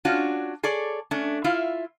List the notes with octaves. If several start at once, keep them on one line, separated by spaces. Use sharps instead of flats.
C#4 D4 F4 F#4
G#4 A4 C#5 D5
A3 C#4 D4
E4 F4 E5 F5